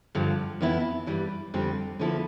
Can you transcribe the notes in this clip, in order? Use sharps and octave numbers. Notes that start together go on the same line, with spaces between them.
G2 D3 F3
F2 E3 B3 E4
G2 E3 G3
F2 D3 G3 C4
D3 F3 B3 E4 A4